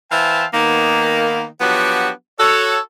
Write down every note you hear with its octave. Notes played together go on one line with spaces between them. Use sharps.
E3 C5 E5 F5 G5 A5
D#3 A#3 B3
F3 F#3 B3 D4 F#4 G4
F#4 A4 C#5